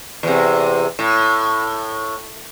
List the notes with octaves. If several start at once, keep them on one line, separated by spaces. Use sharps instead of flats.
E2 C3
A2